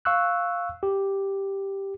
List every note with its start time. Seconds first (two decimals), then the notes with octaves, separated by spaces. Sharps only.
0.05 F5 C#6 E6 F#6
0.83 G4